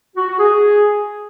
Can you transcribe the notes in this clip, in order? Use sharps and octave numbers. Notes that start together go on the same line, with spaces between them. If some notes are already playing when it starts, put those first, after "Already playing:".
F#4
F#4
G#4